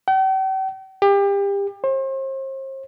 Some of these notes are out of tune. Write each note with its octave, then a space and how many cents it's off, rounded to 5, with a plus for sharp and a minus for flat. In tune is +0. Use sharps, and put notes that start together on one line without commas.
G5 -45
G4 +30
C5 +40